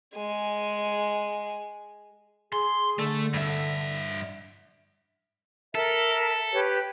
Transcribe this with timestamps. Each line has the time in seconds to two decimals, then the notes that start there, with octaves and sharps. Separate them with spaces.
0.15 G#3 G#5
2.53 G#4 C6
2.99 D3 A3
3.33 G2 E5
5.75 A4 A#4 E5
6.53 G4 B4 C#5